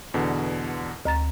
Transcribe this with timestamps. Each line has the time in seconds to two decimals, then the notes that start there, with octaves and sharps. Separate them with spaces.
0.14 E2 B2 D3
1.05 D2 A#5 A6